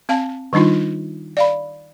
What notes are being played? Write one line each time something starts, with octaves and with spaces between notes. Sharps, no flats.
C4 F5 A5
D#3 G3 D4 D#4 F4
D5 F5 B5